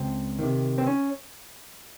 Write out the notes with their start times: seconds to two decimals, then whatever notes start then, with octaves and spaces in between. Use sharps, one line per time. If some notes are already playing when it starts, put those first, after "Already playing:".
Already playing: C#2 C4
0.39 C3 D#3
0.78 C4
0.87 C#4